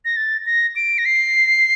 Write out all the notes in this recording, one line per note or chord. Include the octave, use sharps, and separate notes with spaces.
A#6
A6
A#6
D7
A#6
C7